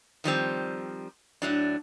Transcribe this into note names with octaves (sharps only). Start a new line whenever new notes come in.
D#3 F3 G3 C4
A2 F#3 D4